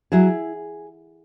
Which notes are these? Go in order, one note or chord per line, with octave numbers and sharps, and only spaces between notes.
F#3 E4 G#4